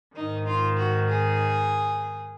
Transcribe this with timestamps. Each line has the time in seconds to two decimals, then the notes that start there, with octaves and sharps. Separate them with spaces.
0.15 G#2 D#3 D#4
0.47 F4
0.77 F#4
1.09 G#4